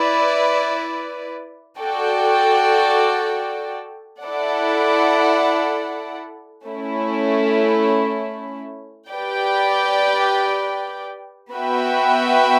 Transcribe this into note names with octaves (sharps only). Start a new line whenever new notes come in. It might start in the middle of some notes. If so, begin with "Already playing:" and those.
Already playing: E4 B4 D5
F#4 A4 D5 G5
E4 A4 D5 F#5
A3 C#4 E4
G4 B4 D5 G5
B3 F#4 B4 E5 G5